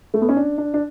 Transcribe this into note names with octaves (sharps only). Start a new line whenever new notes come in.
A3
B3
C#4
D4
D4
D4